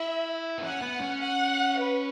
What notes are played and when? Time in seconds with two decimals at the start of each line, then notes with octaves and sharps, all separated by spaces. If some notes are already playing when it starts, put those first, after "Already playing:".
Already playing: E4 E5
0.58 B3
0.62 C#4 F#5
0.82 B3
1.01 C#4
1.20 F#5
1.78 B4